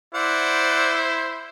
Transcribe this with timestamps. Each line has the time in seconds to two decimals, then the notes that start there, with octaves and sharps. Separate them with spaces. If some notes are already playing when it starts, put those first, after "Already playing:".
0.15 E4 C5 D5 F#5